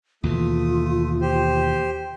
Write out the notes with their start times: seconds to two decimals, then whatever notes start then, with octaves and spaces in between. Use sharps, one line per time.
0.24 D#2 B2 E3 A3 F4 D#6
1.21 G4 C5